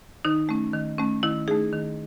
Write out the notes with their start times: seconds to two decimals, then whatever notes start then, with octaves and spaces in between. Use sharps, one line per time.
0.25 D#3 D#4
0.49 A3 C#4
0.74 D#3
0.98 A3 C#4
1.23 D#3 E4
1.48 A3 D#4 G#4
1.72 D#3